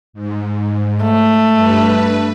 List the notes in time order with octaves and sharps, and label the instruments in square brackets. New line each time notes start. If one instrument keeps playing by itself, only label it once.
[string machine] G#2
[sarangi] A3
[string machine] G2 B4